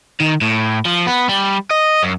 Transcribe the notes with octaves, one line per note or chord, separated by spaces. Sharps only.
D#3
A2
F3
B3
G3
D#5
F#2